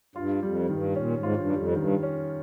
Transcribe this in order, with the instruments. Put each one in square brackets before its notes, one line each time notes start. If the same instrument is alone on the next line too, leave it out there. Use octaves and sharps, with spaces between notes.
[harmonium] G2 [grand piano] F4
[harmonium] F2 [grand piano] G3
[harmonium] G2 [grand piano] D#3
[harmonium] A#2 [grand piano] C#4
[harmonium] G#2
[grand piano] F4
[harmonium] G2
[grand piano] G3
[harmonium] F2
[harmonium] G2 [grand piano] D#3
[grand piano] C#4